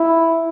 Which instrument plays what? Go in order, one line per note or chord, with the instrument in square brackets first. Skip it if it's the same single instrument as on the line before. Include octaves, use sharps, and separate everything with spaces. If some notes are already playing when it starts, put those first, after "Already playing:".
Already playing: [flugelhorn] E4